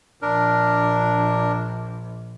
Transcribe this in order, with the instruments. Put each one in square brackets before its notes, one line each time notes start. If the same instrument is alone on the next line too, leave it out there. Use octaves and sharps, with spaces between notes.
[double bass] A#1 [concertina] D4 A#4